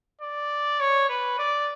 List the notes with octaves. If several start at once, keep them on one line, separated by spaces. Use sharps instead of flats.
D5
C#5
B4
D5